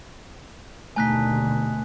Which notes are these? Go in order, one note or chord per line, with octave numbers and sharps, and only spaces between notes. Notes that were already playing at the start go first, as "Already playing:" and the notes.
D#2 B2 D3 A3 D#4 G#5 F#6 B6